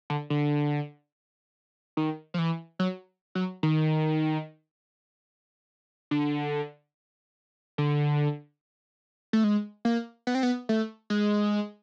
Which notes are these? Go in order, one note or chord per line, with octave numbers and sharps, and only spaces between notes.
D3
D3
D#3
F3
E3
F#3
F#3
D#3
D3
D3
A3
G#3
A#3
B3
C4
B3
A3
G#3